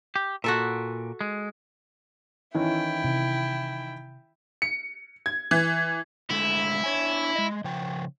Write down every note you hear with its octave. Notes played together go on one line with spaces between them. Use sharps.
G4
A#2 F#4 A4 E5
G#3
D#3 E3 C#4 E4 G5
C3
C#7
G#6
E3
D3 G#3 A3 E4
D4 C#5 G#5
G#3 D#5
C#3 F3 G5